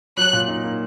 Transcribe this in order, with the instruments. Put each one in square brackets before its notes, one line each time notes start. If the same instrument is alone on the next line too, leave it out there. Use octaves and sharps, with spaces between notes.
[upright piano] F#3 [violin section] F#6
[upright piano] A#2
D#4
A#3